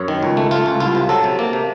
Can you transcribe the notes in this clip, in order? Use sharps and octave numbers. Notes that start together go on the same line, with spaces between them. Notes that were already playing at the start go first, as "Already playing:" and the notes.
Already playing: F#2 C#5
D#3
C#2
A3
A3 F4
C#2
C2 F4
C3
F#3 A4
C3
A#3
C3